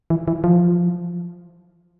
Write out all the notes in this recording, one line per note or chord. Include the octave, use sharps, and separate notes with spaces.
E3
E3
F3